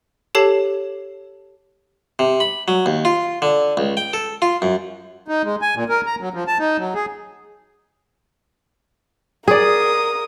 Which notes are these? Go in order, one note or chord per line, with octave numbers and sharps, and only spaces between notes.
G4 A4 C#5 A5 C7
C3
B5
F#3
D#2
F4
D3
C#2
G5
A4
F4
F#2
D#4
G#3
G#5
A#2
A#4
A#5
F#3
F3
A5
D#4
F#3
G#4
G#4 A#4 D5 D#6